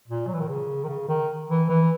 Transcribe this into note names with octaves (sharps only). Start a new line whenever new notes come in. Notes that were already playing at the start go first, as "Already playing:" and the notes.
A#2
F#3
E3
D#3
C#3
D#3
C#3
D#3
E3
E3